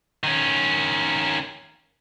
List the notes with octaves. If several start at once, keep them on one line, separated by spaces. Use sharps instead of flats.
D#3 C#4